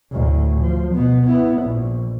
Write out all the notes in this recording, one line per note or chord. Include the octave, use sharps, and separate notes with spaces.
D2 A2
F3
B2 B3
B3 E4
A#1